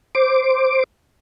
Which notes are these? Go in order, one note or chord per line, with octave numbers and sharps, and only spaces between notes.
C5 D6